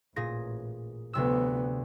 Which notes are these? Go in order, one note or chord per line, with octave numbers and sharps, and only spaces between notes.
A1 A#2 G#4 A#6
D2 C3 F3 B3 E6